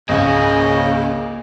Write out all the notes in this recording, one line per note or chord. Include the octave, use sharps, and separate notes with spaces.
G#1 C#2 C#3 A#3 D#5 G#5